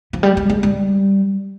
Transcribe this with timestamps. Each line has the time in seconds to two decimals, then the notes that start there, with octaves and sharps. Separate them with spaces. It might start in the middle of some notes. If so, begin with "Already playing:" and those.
0.13 F3
0.23 G3
0.37 G3
0.50 G#3
0.63 G3